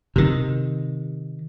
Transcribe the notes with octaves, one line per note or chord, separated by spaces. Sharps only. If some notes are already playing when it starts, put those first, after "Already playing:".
C3 D#3